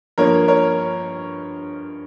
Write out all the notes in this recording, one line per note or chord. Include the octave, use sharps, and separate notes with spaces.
G2 F3 A#3 A#4 C#5
A#4 C#5